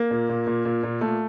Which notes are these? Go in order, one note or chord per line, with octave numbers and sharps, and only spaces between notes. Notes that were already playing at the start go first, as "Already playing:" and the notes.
Already playing: A#3
A#2
A#2
A#2
A#2
A#2
A#2 A3